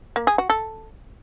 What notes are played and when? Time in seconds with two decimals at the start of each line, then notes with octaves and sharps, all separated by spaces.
0.16 A#3
0.27 G#4
0.38 F#4
0.50 A4